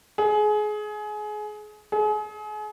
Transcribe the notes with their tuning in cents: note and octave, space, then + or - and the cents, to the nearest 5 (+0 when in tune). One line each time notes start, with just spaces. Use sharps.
G#4 +25
G#4 +35